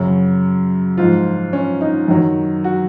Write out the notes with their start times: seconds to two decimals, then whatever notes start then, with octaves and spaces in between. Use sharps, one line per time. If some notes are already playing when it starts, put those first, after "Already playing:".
Already playing: F#2 C#3 F#3
0.97 G#2 F3 F4
1.53 C#4
1.81 D#4
2.08 F#2 D#3 F#3
2.64 F#4